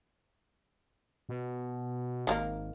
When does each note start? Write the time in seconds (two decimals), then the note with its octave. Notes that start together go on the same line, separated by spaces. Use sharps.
1.29 B2
2.27 G#1 D#3 F#3 A#3